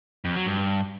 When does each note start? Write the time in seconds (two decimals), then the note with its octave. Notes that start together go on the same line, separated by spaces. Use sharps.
0.25 F2
0.36 F#3
0.46 G2